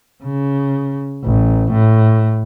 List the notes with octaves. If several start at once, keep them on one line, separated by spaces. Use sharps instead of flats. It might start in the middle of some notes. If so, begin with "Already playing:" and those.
C#3
A1
A2